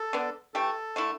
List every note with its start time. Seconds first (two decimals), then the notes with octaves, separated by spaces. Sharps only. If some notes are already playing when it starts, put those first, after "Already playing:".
Already playing: A4
0.13 D3 B3 D4
0.54 E3 A3 G4 A4
0.96 D3 A3 E4